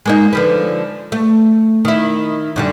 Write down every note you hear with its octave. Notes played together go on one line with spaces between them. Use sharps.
G#3 A#3 D#4
D3 F3 B4
A3
D#3 E4
F#2 D3 G3